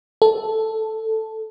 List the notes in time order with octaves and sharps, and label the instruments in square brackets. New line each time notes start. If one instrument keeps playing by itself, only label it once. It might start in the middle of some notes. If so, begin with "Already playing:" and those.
[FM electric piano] A4